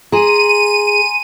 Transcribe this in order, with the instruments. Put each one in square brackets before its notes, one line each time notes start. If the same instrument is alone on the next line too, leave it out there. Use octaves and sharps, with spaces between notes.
[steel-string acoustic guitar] G#4 [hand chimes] G#5 A#5 C6 [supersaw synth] D#7